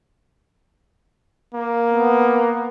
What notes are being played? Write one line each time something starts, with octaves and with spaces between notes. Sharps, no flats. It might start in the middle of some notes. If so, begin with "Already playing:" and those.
A#3
B3